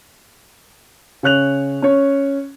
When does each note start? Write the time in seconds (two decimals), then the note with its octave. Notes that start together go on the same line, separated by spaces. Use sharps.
1.23 C#3 C#5 F#6 F7
1.82 C#4 C#5